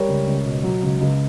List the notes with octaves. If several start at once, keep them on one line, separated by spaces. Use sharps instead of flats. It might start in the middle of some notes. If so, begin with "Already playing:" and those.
Already playing: G3 A#4 C#5
C#2
C#2
B2
F#3
C#2
C#2